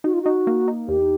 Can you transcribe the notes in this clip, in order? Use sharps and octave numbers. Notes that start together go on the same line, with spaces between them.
D#4 F#4
F4
D#4 F#4
A#3
D#4
E2 G4